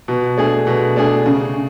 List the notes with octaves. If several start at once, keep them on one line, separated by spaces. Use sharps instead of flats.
B2
A3 D4 G#4
B2
A3 D4 G#4
C#3